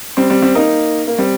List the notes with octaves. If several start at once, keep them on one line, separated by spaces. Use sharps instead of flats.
G3 C4
G3 C4
G3 C4
A#3 D#4
A#3
G3 C4